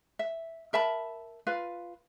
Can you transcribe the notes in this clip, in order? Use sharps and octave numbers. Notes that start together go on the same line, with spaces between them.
E5
A#4 E5 A5 B5
F4 B4 F5